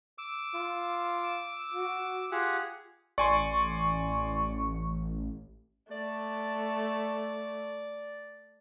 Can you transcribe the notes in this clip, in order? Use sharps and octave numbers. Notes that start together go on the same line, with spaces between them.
D6 E6
F4
F#4
F4 G4 G#4 F#5
A1 D5 G#5 C6 C#6
A3 D5